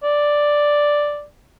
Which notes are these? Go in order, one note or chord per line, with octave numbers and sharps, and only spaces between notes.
D5